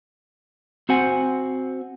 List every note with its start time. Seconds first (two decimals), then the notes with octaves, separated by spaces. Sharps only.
0.89 C4 F#4 C5 F#5 G#5